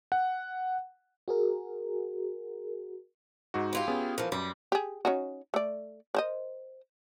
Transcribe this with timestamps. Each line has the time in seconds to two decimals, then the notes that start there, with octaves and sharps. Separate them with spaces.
0.12 F#5
1.28 F#4 G#4 A#4
3.54 G#2 D#4 F#4
3.73 E4 F4 G4
3.88 B3 C#4 G#4
4.18 E3 F3 A#4
4.32 F#2 G3
4.72 G4 G#4
5.05 C#4 D#4 F#4
5.54 A3 D5
6.15 A#4 C5 D#5